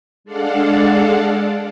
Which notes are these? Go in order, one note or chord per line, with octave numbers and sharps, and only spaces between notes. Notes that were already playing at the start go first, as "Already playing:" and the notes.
G#3 D4 A4 D5 F5 F#5